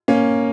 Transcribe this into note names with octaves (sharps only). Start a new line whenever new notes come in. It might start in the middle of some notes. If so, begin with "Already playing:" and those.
A#3 C#4